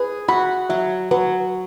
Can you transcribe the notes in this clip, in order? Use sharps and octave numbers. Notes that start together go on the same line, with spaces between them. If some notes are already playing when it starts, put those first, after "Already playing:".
Already playing: G#4 B4
F#4 B5
F#3 E5
F#3 B4